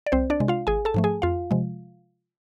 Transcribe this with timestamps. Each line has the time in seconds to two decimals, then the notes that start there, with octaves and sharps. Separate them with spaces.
0.06 D5
0.12 C2 C4 C5
0.30 D4 D5
0.40 C3 G#3
0.48 F4 F5
0.67 G#1 G#4 G#5
0.85 A4 A5
0.94 G#2 F3 A3
1.04 G#4 G#5
1.22 F2 F4 F5
1.51 C3 F3 G#3